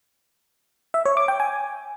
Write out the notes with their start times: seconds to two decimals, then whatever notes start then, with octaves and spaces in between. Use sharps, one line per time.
0.94 E5
1.06 C#5
1.17 D6
1.28 G5
1.40 G#5